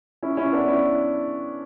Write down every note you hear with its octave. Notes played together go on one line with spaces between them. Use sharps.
C#4 E4
C#4 E4
B3 D4
C#4 E4